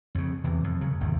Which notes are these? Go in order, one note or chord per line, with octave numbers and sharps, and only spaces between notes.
F2 C#3
E2 C3 E3
F2
C#3 F#3
G#1 E2 C3